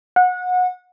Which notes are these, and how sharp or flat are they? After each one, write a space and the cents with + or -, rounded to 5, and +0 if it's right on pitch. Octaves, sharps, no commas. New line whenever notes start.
F#5 -25